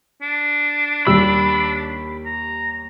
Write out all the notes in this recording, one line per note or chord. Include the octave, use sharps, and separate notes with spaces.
D4
D#2 G3 B5 E6
A#5